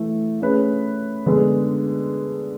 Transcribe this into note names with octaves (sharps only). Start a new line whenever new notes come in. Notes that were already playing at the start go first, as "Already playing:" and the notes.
Already playing: E3 A3
A3 C#4 G#4 B4
D3 G#3 B3 D4 G#4